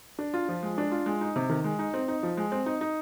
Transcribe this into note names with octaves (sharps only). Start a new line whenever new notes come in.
D4
F4
F3
G#3
D4
F4
G#3
D#4
C3
D#3
G#3
D#4
C4
D#4
F3
G#3
C4
D#4
D#4